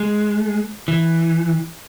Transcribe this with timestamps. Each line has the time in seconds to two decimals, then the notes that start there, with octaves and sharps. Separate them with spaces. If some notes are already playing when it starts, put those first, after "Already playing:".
Already playing: G#3
0.88 E3